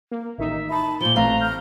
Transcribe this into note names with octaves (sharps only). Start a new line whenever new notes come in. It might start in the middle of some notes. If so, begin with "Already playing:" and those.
A#3
A1 D#3 D#4 E5
D#4 A5 B5
A#2 F3 C5 G7
A1 A3 C4 B4 F5 A#5
F6 G6